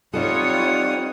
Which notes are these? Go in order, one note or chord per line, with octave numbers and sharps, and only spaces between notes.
G3 C4 D#4 F4 A4 C#5 F#5 D#6